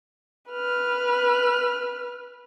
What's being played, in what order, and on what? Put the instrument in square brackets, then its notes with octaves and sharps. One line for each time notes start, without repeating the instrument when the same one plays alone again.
[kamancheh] B4 F6